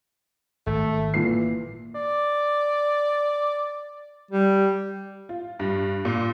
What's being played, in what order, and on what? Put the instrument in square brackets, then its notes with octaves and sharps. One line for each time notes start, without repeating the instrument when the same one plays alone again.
[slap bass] G#1 [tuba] A3
[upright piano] A#2 C7 [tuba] E3
[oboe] D5
[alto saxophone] G3
[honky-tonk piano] F4
G2
A#2